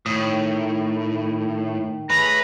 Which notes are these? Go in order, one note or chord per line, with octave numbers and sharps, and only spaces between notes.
A2 D#3 D#6
A3 G#4 B4 C#5 A#5